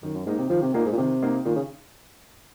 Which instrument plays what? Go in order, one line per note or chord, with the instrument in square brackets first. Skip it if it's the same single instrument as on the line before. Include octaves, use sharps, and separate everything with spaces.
[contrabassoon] F#2 [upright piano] D#3
[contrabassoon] F#2
[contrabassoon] G#2 [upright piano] A#3 D#4
[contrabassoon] C3
[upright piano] D#3 [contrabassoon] F3
[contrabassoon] C3
[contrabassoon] A#2 [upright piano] A#3 D#4
[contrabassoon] G#2
A#2
[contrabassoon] C3 [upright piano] D#3
[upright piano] A#3 D#4
[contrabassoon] A#2 [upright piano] D#3
[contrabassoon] C#3